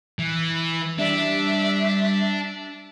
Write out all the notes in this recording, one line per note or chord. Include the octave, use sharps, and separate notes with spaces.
E3
G3 D4 E5